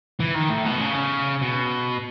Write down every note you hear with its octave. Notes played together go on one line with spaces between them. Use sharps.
E3
D#3
A2
B2
C#3
B2